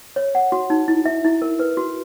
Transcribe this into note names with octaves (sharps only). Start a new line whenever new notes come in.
C#5
F#5
F#4
D#4
E4
E5
E4
A#4
B4
F#4